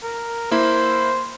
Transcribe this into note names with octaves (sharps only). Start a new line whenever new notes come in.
A#4
A#3 E4 C5